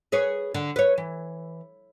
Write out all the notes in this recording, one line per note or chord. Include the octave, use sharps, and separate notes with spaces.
G#4 B4 C#5
D3
B4 C#5
E3